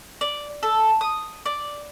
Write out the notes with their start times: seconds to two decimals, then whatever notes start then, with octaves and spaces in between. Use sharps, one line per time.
0.21 D5
0.63 A4
1.01 D#6
1.46 D5